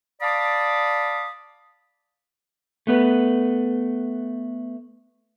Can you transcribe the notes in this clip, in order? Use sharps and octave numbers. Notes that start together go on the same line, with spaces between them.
D5 F5 A5 B5 D6 D#6
A3 B3 B4